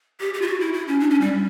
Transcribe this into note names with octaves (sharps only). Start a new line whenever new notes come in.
G4
G4
F4
F#4
E4
E4
C#4
D4
C#4
G3